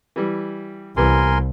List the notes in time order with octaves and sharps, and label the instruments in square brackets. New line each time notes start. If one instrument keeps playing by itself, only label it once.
[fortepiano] E3 G3
[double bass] C2 [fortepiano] E3 G3 B3 [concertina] A#4 G#5 C6